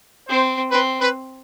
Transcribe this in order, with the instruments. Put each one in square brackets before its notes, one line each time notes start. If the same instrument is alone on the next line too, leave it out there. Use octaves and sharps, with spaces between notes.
[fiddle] C4 [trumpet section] C5
[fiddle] C4 [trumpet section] B4
[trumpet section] B4